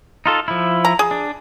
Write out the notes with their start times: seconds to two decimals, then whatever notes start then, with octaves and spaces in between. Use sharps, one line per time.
0.26 D#4 F4 A4
0.48 F3 E4
0.85 A#5
0.99 G#4
1.11 D4